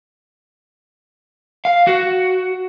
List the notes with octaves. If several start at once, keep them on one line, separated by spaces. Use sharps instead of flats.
F5
F#4